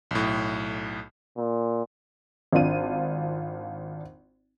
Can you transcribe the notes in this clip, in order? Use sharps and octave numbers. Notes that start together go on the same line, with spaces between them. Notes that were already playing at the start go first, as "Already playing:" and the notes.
B1 A2
A#2
G#1 D4 F4 D#7